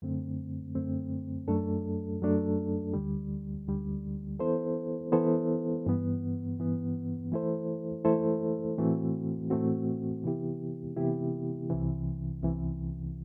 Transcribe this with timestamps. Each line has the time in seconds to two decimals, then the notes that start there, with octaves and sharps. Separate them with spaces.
0.02 F#2 D3 A3 C4
0.75 F#2 D3 A3 C4
1.48 F#2 F#3 A3 D4 A4
2.21 F#2 F#3 A3 D4 A4
2.94 D2 D3 G3
3.67 D2 D3 G3
4.39 E3 B3 E4 A4 C5
5.12 E3 B3 E4 A4 C5
5.86 G2 E3 B3
6.59 G2 E3 B3
7.32 E3 A3 E4 A4 C5
8.05 E3 A3 E4 A4 C5
8.78 A2 E3 A3 C4 F#4
9.50 A2 E3 A3 C4 F#4
10.23 C3 E3 B3 E4 G4
10.96 C3 E3 B3 E4 G4
11.70 C2 C3 E3
12.42 C2 C3 E3